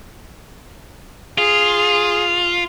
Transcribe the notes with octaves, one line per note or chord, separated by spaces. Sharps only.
F4 G#4